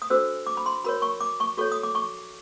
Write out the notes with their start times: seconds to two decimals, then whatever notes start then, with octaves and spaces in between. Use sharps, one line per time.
0.02 D#6
0.10 D4 F#4 A4 C5 E6
0.47 D6
0.57 B5
0.66 C6
0.84 F#4 A#4 C#5 B5
1.02 C#6
1.21 D6
1.40 C#6
1.58 F#4 A4 C#5 C#6
1.72 D#6
1.83 D6
1.95 C#6